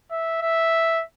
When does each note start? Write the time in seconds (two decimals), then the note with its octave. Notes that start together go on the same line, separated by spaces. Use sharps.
0.11 E5
0.41 E5